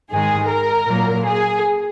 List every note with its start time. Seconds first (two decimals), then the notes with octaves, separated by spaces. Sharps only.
0.11 G#2 D#3 G#3 G#4
0.49 A#4
0.87 A#2 F#3 A#3
1.26 G#4